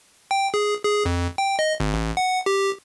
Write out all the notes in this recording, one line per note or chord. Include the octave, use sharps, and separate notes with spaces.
G5
G#4
G#4
F2
G5
D#5
G#1
A1
F#5
G4